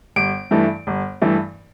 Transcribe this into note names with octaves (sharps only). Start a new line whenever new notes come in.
G1 D7
G2 E3 A3
G1
G2 E3 A3